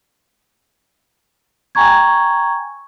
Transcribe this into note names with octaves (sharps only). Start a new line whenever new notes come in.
G5 G#5 A#5 C#6 G#6